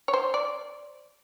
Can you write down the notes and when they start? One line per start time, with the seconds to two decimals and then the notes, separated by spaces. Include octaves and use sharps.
0.08 C#5
0.14 C5
0.34 D5